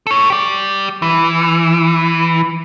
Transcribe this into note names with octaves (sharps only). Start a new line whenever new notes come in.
A4 C#5
G4 D5
E3